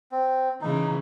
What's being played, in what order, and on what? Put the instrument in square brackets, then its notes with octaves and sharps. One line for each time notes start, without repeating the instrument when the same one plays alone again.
[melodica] C4
[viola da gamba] C#3 E3 [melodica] D#4